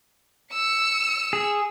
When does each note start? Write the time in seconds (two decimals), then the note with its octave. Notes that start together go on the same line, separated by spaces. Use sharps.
0.53 E6 C#7
1.33 G#4